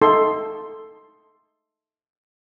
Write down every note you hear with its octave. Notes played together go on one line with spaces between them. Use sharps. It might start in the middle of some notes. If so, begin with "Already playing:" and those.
D#4 A4 C6